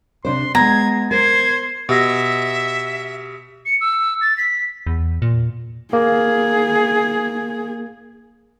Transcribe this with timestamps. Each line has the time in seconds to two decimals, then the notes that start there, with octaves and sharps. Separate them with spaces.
0.25 C3 D4 C5 C6
0.55 G#3 B3 A#5 G#6
1.11 A#4 C5 G#6
1.89 B2 G4 E5 E6 A#6
3.65 C#7
3.81 E6
4.21 A6
4.37 B6
4.87 E2
5.22 A#2
5.93 A#3 G#4